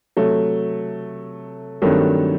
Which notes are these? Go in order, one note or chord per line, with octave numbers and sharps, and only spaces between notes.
C3 F#3 A3
G2 D#3 F#3 A3 C4